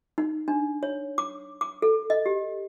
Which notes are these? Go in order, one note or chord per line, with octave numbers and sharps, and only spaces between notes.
D#4
D4
C#5
D6
D6
A4
D#5
G4